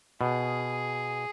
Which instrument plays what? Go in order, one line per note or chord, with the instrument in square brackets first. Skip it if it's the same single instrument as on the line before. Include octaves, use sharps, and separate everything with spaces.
[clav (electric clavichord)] B2 [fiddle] G#4